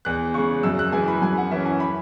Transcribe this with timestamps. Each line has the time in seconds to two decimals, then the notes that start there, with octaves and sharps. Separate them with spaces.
0.05 E2 F#6
0.34 C#3 G#3 C#6
0.63 F#2 E6
0.79 F#6
0.92 E3 G#3 G#5
1.08 B5
1.22 F#2 G#5
1.37 F#5
1.51 E3 C#4 E5
1.66 G#5
1.80 B5